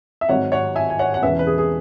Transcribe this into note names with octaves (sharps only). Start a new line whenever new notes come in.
E5
G#1 G#2 F#3 C#5 F#5
C#5 F#5
E5 G#5
G#5
C#5 F#5
F#5
E1 E2 C#3 E3 B4 E5
B4
G#4
G#4